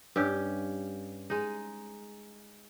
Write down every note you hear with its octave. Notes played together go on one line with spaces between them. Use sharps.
G2 C#4 G4
G#3 D#4